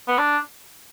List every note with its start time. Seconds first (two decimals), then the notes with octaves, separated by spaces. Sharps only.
0.08 B3
0.18 D4